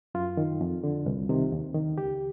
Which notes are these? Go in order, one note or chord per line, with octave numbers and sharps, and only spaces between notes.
F#2 F4
D#3
F2
D3
C2
C3 D#3
D#2
D#3
C#2 G4